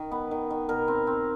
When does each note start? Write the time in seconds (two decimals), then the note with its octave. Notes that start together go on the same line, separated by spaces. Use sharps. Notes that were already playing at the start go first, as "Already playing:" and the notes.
Already playing: D#3
0.11 B3
0.31 D#3
0.50 D#3
0.69 B2 A#4
0.88 C4
1.07 C4